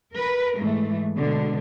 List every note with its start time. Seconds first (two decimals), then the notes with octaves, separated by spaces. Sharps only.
0.13 A#4 B4
0.57 G#2 E3 G#3 A3
1.17 B2 D3 G#3